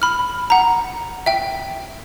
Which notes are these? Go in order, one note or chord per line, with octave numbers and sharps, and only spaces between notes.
B5 F6
F#5 A#5
E5 G5